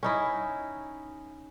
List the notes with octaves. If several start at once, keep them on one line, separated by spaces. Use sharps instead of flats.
C#4 D#4 E4